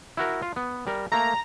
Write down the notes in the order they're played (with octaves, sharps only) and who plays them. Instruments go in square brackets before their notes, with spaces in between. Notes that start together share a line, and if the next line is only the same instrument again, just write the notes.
[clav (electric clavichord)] E4 F#4 A#4
F4
B3
G3 A#4
[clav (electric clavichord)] A3 A#3 [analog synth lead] A#5